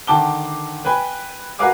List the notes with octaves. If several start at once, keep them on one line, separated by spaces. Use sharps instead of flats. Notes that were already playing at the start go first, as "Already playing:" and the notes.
D3 D#3 G5 A5 D6 G7
B4 G5 G#5 B5
F#4 A#4 B4 F5 G#5 D6